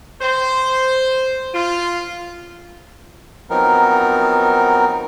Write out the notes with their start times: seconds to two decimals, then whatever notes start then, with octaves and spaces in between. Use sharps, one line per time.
0.21 C5
1.54 F4
3.50 F3 F#3 B3 C4 D#4 A#4